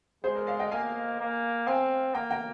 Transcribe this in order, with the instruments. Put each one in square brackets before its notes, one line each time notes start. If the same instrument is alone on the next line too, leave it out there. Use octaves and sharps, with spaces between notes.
[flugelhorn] G#3 [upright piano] G#4 C5
[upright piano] A#4 D5
D5 F5
D#5 G5
[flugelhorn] A#3 [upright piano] F5 G#5
[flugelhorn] A#3
[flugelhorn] C4 [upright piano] F5 G#5
[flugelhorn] A#3 [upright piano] G5 A#5
[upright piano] G5 A#5